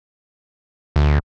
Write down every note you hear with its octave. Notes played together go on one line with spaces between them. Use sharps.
D2